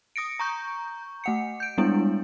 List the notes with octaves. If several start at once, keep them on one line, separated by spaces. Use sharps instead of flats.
D#6 A#6 C#7 D7
A#5 C#6 G6
A3 F#5 C#7
G6 D7
G3 G#3 B3 D4 E4